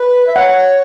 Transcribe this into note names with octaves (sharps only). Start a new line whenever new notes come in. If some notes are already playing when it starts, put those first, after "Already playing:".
Already playing: B4
E5
C#5 F#5